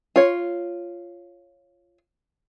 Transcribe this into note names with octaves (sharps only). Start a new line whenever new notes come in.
F4 C#5